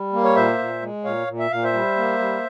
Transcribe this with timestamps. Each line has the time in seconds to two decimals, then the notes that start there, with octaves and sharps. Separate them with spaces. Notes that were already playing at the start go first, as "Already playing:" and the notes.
Already playing: G3
0.13 A#3
0.24 C#5
0.36 A#2 C5 E5
0.58 A#2
0.82 G#3
1.04 A#2 C#5 F5
1.27 A#2
1.39 E5
1.50 A#2 F5
1.64 C5 E5
1.73 G3
1.96 A#3
2.19 G3